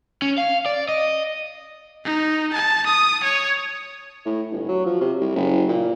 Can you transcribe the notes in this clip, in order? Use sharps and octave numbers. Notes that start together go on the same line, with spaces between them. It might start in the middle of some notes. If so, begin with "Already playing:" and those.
C#4
F5
D5
D#5
D#4
A5
D#6
C#5
A2
G1
F#3
F3
C3
C2
F#1
A#2